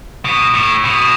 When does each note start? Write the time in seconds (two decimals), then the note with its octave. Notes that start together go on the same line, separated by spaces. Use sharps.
0.25 B2
0.54 A2
0.85 B2